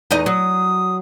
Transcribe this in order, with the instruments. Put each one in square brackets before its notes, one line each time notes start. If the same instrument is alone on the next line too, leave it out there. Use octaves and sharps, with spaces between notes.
[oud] E2 D#4 D#5
[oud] F#3 [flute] D#6